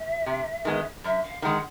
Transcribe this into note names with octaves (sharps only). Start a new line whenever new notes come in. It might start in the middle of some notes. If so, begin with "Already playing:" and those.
Already playing: E5
C3
D#3 G#3 B3
F#2 E5
F5
D#3 G#3 F#5